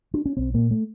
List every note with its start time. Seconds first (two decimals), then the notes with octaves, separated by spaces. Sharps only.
0.14 D4
0.26 C#4
0.37 B1 C4
0.54 A#2 A#3
0.71 A3